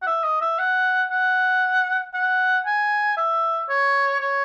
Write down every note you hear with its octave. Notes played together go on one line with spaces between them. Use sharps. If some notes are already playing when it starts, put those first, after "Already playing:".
F#5
E5
D#5
E5
F#5
F#5
F#5
G#5
E5
C#5
C#5